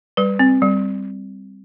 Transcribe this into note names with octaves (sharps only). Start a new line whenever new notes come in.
G3 B4
C4
G3